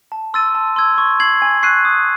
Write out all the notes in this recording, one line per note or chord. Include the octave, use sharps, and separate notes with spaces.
A5
C6 E6 A6 D#7
A5
C6 E6 G#6
C#6
G#6 C7 F#7
G#5
C#6 F#6 C7 D#7
D#6